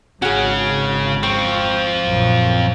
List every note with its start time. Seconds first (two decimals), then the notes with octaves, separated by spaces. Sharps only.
0.22 G#1 C#3 C#4 F#4 G#4
1.23 F3 C4 C#6
2.03 A#1 F#2